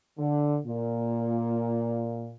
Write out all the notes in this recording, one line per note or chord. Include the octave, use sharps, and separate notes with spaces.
D3
A#2